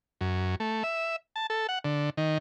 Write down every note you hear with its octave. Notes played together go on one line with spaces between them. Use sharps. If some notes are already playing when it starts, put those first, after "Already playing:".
F#2
A3
E5
A5
A4
F#5
D3
D#3